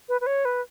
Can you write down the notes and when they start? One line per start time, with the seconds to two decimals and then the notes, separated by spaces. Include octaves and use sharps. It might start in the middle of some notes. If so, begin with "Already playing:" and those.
0.09 B4
0.21 B4
0.27 C#5
0.45 B4